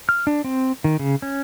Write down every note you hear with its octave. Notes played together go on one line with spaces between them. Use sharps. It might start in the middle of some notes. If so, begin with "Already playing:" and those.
F6
D4
C4
D#3
C#3
C#4